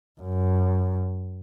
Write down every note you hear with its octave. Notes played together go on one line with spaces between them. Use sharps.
F#2